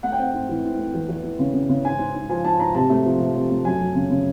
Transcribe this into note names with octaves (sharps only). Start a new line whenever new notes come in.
A3 F#5
G5
C4 F#5
G#2
E3
G#2
A3
E2
E2
E3
C#3
C#3
C#3
G#2 G#5
G#2
G#2
F3 G#5
G#2 A5
G#2 A#5
C3 A5
A3
F3
C3
C3
A3
F#2 G#5
F#2
C#3
C#3